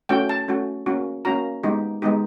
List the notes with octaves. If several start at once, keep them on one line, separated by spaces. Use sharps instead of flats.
A3 C#4 F#4 G5
A5
A3 C#4 F#4
A#3 C#4 F#4
A#3 C#4 F#4 A#5
G#3 B3 D#4 G4
G#3 B3 D#4 G4